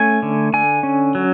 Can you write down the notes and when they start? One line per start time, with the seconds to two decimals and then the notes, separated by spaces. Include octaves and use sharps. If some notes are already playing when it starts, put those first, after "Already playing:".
Already playing: A3 C#4 G#5
0.22 D3
0.53 D3 G#5
0.83 C#4
1.15 F#3